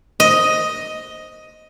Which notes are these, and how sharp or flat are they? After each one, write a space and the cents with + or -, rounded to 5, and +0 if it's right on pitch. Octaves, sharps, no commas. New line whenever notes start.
D#5 +5